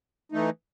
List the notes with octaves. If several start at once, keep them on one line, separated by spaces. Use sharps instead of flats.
E3 A3 D#4